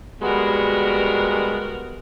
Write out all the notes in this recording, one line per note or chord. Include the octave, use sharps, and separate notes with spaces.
G3 G#3 B3 F#4 A#4